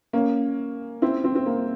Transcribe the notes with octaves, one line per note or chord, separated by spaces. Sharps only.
A#3 C#4
C4 E4
C4
C4
A#3